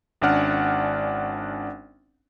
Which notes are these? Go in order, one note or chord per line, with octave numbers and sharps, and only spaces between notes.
G#1 C#4 D4 D5 F#5 F6